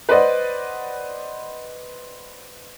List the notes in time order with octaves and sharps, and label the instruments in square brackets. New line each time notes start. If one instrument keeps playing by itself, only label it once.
[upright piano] B4 C5 D5 D#5 F#5